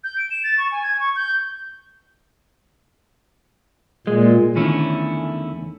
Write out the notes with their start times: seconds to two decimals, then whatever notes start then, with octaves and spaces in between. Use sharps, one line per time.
0.04 G6
0.18 D7
0.30 E7
0.44 A6
0.58 C#6
0.72 G#5
0.83 G#6
1.00 C#6
1.16 G6
4.07 A#2 G#3
4.56 E2 D3 D#3 A3 C#4 E4